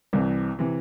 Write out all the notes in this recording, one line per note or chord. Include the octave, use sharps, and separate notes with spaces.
C2 C3 E3
C3 E3